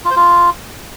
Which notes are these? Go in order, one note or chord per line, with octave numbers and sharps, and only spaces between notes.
F4
C5
F4